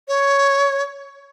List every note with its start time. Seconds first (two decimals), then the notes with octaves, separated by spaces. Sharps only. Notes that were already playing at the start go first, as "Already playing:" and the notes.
0.08 C#5